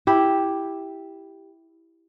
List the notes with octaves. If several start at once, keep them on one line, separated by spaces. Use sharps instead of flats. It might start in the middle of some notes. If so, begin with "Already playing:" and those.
E4 G4